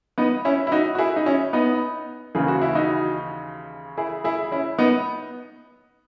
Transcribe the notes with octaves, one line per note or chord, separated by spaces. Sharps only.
B3 D#4
C#4 E4
E4
D#4 F#4
F#4
E4 G#4
D#4
C#4 E4
B3 D#4
D#2 C#3 E3 G#4
F#4
E4
D#4 F#4
E4 G#4
E4 G#4
C#4 E4
B3 D#4